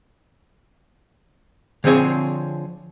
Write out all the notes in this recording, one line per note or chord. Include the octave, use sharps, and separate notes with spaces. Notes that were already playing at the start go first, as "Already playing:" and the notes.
D3 F3 C4 G#4 C#5